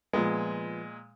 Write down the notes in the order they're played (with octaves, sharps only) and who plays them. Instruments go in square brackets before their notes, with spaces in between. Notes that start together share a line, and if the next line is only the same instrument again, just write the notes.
[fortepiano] A#2 G#3 [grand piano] F3 B3